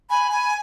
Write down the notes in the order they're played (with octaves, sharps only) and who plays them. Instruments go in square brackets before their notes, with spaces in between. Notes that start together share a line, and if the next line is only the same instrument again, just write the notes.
[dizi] G#5 [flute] B5
[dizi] G#5